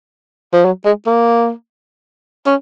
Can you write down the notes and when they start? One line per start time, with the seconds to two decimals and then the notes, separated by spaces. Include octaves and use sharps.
0.53 F3
0.65 F#3
0.85 G#3
1.06 A#3
2.46 C#4